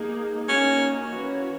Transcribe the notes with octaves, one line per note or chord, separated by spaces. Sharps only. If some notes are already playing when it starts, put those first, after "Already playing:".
Already playing: A#3 D#4 G#4
A#3 C#4 D#4 F#4
E3 A#3 C#4 F#4 C#5